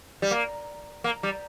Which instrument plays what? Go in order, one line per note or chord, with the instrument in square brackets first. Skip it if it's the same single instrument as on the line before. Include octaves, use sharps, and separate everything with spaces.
[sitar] G3
A#3
A#3
G3